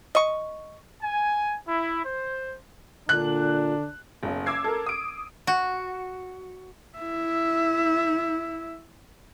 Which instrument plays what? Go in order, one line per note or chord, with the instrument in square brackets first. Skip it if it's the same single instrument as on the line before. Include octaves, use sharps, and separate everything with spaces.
[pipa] D#5 C#6
[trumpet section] G#5
E4
C5
[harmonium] A#2 [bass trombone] D3 [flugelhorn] D4 [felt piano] F#6
[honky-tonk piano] F#1 B1
D6 E6 G#6 C7
A4 A#4
D#6 D7
[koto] F#4
[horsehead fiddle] E4 E5